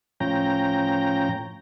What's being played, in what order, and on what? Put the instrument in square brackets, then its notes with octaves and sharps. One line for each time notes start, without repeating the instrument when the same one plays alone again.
[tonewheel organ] A2 F3 C#4 G5 A#5